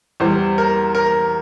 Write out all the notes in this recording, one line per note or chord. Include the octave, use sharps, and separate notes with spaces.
E2 E3 G3 C5
A#4
A#4